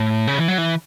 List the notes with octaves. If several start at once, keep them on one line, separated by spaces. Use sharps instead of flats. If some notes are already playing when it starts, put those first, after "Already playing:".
Already playing: A2
C#3
E3
F#3
E3